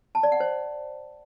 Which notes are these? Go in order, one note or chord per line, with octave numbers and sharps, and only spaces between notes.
A5
D5
F#5
C5